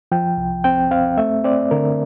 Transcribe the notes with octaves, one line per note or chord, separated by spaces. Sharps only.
F3 G5
C2
C4 G5
C4 F5
A3 E5
C4 D5
D3 A#4